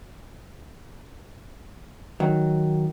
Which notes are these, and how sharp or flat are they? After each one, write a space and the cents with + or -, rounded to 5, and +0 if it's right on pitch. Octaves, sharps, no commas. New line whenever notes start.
D#3 +0 F#3 +0